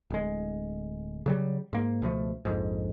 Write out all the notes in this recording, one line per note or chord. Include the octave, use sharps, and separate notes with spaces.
D1 G#3
C#3 F#3 G3
G#2 A#3
C#2 B2 F3 A3
A#1 F2 G#2